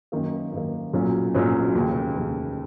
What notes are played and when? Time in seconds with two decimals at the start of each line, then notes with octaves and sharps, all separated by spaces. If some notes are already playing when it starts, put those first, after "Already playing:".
0.12 F#2 D#3 A#3
0.52 F#2 D#3 A#3
0.93 B1 A#2 F#3 C#4
1.34 B1 A#2 F#3 C#4
1.74 F1 D#2 C#3
2.15 F1 D#2 C#3